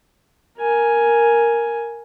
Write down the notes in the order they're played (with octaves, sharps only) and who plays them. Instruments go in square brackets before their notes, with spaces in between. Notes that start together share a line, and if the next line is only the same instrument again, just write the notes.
[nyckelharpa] A#4 G#5